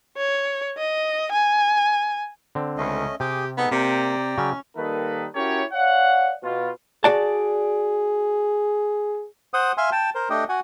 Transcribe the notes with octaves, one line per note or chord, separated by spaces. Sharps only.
C#5
D#5
G#5
D3 C4
C#2 A3 C#4 D#5
C3 G4 G#4 G#5 D6
B3 D#4 G#4 A4
C3 A#3 D5 G5 A#5
C#3 F#3 C#4
D#3 G3 A#3 D#4 A4 B4
C#4 E4 F#4 G4 A#4 C#5
C#5 D5 F5 F#5
B2 F4
F#4 G#4 D5 A5
C5 F#5 D#6
E5 F5 G#5 C6
G5 A5
A#4 C5
A3 D4 G4 D#5 G5
F#4 F#5 G#5